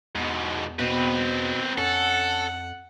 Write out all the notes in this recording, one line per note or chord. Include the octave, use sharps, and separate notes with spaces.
E2 G#2 B2
B2 C4 B4
F2 C#4 A4 F#5